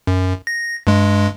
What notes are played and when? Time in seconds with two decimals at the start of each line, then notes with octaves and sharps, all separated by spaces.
0.07 F#2
0.47 A#6
0.87 G2 G#3